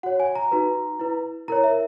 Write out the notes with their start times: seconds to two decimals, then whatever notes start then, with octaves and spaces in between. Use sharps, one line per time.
0.03 F#4 C#5 F#5
0.20 G#5
0.36 A#5
0.51 D#4 F#4 B4
1.00 E4 B4
1.48 E4 A#4 C#5 A#5
1.64 E5